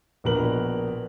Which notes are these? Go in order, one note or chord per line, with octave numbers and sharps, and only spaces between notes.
A#1 B2 A#4 B4 F#7